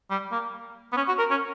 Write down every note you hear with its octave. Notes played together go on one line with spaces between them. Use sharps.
G3
A#3
B3
C#4
F#4
A#4
C#4